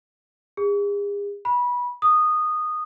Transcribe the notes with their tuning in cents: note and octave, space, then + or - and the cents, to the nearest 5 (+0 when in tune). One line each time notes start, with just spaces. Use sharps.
G#4 -40
B5 -20
D#6 -15